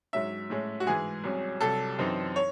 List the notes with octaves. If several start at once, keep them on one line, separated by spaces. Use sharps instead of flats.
G#2 F#3 C#4 E5
A2 G#3 C#4
F#4
G#2 E3 G#3 G#4
C2 C3 F#3 C#4
C2 C3 F#3 A4
F#2 E3 C4 D#4
C#5